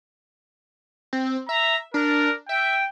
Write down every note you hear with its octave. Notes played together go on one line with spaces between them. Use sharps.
C4
E5 A#5
D4 A#4
E5 G5